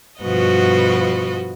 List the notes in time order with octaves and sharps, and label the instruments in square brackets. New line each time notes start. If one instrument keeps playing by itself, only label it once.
[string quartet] G2 B2 F3 F#4 B4 D#5